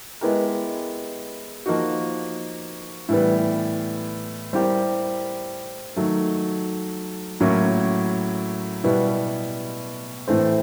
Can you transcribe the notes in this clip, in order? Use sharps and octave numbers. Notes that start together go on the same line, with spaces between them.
G#3 B3 E4 G4 A#4
F3 A#3 D#4 F#4
A2 E3 G3 B3
G3 C4 E4 G4 A#4
D#3 F#3 A3
A2 F#3 A#3 C#4 E4
B2 G3 B3 E4
A2 E3 A3 C4